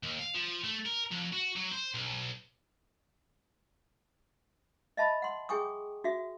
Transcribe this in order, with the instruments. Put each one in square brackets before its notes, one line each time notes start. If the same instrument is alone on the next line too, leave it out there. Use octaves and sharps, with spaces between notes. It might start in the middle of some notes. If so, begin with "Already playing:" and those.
[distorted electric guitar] D#2
F5
F3
A3
A#4
F2
F#4
F#3
C5
B1
[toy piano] D#5 E5 A5 B5
F#5 C6
G#4 G5 G#5 C#6 D#6
F#4 E5